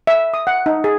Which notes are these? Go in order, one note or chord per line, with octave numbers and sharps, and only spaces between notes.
E5
D#6
F#5
D#4
G#4